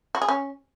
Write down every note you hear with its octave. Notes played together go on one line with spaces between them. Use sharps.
F#4
G#4
C#4